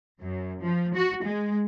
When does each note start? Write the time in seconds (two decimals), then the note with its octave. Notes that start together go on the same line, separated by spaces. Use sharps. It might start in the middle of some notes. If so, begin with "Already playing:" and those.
0.20 F#2
0.62 F3
0.95 F#4
1.24 G#3